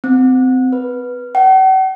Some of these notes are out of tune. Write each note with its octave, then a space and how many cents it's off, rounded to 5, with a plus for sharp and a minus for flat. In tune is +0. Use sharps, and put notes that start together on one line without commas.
C4 -25
B4 -10
F#5 +45